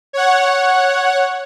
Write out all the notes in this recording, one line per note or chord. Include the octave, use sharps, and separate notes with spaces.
C#5 F#5